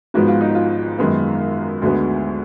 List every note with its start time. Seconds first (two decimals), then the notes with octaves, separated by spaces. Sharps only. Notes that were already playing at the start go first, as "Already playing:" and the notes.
0.14 G#1 G#2 F3 G#3 B3 F#4
0.28 F4
0.41 D#4
0.55 F4
0.98 F#2 D#3 G#3 B3
1.82 D2 D3 G#3 B3 F#4